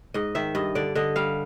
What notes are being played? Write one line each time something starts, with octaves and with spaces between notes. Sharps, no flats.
G#2 D#5
D#3 E5
G2 D#5
D3 D5
D3 D#5
G3 F5